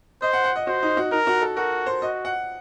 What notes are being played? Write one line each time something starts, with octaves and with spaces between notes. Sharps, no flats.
C5 D#5
F#5
F#5
D#5
F#4 C5
D#4
F#4
D#4 A#4
F#4
A4
F#4 A#4
C5
F#4 D#5
F#5